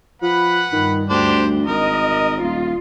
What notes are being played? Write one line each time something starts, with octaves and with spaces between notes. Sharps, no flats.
F3 B4 F#5 B5
G2 D#3
D2 D4 G4 C5
G#1 A#4 D#5
D#1 F4